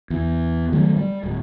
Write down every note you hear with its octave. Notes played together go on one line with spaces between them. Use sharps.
E2
D#3 F#3 A3
G3
D1